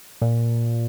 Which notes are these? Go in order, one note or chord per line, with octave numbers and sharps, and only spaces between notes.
A#2